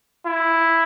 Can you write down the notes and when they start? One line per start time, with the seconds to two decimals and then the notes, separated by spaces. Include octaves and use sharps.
0.26 E4